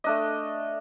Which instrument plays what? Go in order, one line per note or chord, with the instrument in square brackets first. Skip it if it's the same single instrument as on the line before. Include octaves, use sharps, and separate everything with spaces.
[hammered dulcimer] A3 D4 D#5